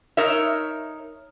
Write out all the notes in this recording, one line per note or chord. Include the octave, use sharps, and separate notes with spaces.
D#4 A#4 C#5 E5